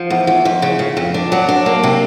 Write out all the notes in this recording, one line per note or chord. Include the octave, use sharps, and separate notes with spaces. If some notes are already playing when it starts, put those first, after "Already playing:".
Already playing: F3
E2
E2
F2
C#3
C#3
F2
D4
F#3
D4
A#3
C3